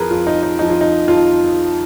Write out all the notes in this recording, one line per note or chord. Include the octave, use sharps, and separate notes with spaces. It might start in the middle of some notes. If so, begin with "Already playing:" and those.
Already playing: F2 F3 G#4 A#4 B4
F2 F3 F4
D#4
D#4
F2 F3 D#4
F4
D#4
F2 F3 F4